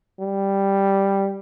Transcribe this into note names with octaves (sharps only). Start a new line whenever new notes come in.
G3